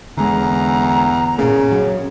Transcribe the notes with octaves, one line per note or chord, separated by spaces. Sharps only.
E2 D3 G#3 A#5
A#2 C#3 A#3
F#3 C4 C#4